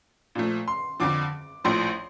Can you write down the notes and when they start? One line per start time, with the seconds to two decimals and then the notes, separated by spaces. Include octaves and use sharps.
0.35 A#2 F3 A3
0.68 C6
1.00 F2 D3 F3 D6
1.64 A#1 A2 F3 C6